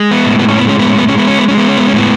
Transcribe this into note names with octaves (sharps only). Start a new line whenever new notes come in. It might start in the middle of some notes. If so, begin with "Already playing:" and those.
Already playing: G#3
B3
A2
B3
C#4
B3
G#3 C#4
B3
C#4
B3
G#3 C#4
B3
C#4
B3
G#3 C#4
B3
C#4
B3
C#4
A2 B3